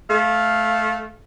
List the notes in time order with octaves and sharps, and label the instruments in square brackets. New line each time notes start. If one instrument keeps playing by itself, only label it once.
[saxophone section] A3 F5